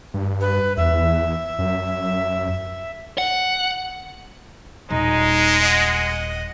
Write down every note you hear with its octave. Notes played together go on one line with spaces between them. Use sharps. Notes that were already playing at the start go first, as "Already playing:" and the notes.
G2
B4
E2 E5
F#2
F#5
D#1 G#3 D#4
D#5 F#5